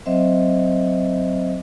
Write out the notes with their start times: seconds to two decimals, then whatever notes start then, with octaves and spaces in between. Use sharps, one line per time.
0.06 F#3 C4 C5 D#5 E5